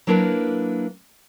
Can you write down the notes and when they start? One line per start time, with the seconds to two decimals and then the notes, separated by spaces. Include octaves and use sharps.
0.07 F#3 A#3 D4 E4 A#4 B4